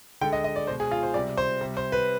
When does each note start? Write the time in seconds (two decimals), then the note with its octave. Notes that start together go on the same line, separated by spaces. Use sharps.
0.21 D3 G#3 G5
0.33 D#5
0.44 D#5
0.56 D5
0.67 B2 G#3 C5
0.80 G#4
0.91 F4
1.03 C5
1.14 C3 G3 D5
1.37 C5
1.61 C3 G3
1.77 C5
1.92 B4